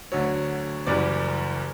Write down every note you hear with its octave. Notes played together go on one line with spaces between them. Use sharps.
D2 D3 F#3 C#5
F#1 F#2 E3 G3 D5